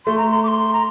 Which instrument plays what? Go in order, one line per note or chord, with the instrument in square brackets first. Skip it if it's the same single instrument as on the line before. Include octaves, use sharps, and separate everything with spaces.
[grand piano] A3 [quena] C6
[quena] A#5
C6
D6
C6
A#5